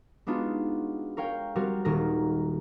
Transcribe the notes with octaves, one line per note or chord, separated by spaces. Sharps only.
G#3 B3 D4 D#4 F4 F#4
A#4 C#5 F5 G5
G3 C4 F#4 A#4
D#1 D#3 A#3 A#4 A#6